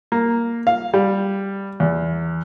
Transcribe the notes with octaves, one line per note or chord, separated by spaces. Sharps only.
A#3
F5
G3
E2